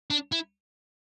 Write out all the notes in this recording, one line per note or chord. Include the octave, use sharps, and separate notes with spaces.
D4
E4